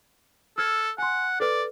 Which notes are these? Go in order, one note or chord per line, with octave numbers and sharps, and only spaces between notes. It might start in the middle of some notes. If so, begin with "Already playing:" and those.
A4 E6 F6 G#6
F#5 G#5 C6
A4 B4 D5